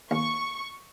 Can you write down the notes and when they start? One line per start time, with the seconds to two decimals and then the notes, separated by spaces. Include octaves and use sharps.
0.11 D#2 C#6